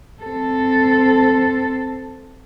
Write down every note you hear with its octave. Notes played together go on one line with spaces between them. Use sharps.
C4 A4